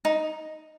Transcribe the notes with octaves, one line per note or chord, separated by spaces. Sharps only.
D#4